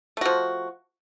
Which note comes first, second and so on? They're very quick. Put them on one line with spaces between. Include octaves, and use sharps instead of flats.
A3 F#4 F3